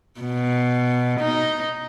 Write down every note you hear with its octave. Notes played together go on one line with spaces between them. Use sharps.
B2
D#4